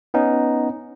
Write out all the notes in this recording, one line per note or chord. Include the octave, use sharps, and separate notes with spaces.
B3 C#4 D#4